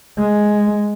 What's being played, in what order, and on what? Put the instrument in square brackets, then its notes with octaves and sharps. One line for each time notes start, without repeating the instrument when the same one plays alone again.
[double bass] G#3